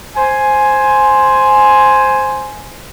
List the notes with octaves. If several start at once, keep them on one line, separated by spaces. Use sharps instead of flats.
C5 G#5